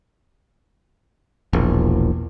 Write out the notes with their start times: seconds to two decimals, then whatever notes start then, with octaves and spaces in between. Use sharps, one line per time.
1.53 E1 A#1